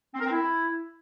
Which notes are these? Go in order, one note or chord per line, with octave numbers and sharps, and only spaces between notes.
C4
A#4
C4
E4